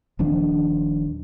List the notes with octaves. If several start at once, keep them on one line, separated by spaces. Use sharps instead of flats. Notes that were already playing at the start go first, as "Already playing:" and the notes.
D#1 D#3 F3 D4